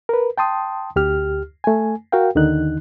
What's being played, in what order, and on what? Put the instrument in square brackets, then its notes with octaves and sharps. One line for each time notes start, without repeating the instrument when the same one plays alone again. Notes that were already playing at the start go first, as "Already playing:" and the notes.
[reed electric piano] A#4 B4
G5 A5 C6 D#6
D2 G4 F6
A3 G#5
F#4 A#4 F5 G5
D#2 D3 D#3 D#4 F#6